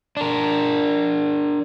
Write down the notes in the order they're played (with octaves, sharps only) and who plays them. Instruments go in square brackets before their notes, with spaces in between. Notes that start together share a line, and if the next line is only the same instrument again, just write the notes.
[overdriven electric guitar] D4 A#4